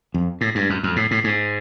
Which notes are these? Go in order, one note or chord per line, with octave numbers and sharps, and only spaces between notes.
F2
A2
G2
F#2
F2
A2
A2
G#2